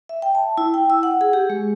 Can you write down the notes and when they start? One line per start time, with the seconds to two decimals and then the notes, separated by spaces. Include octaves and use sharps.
0.09 E5
0.22 G5
0.35 A5
0.58 E4
0.74 G5
0.90 E6
1.03 F#5
1.21 G#4
1.33 G4
1.50 G#3